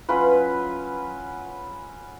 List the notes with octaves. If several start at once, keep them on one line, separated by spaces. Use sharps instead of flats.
F#3 C#4 F4 B4